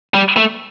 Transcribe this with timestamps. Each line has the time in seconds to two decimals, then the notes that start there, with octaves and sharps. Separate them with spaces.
0.14 G3
0.37 A3